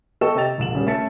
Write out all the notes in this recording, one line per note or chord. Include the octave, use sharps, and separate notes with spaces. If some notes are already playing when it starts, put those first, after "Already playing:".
B3 A4 D#5 G5 C#6 E7
C3 G4 D#5 G5 A6 F7
E1 A#1 E7 F#7
D#1 C#3 G3 C#4 D4
A3 C#4 E5 A5 A6 C#7